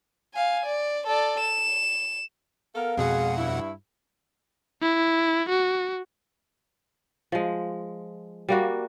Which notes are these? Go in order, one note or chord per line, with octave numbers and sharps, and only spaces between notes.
F5 G#5
D5
A4 D5
E7
B3 A4 A#4 F5
F2 B2 G#3 B3 G#4 F#5
G2 E4
E4
F#4
F3 G#3
G3 A#3 F#4